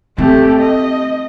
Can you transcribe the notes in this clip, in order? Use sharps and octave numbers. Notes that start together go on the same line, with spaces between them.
A3 C4 G4
D#5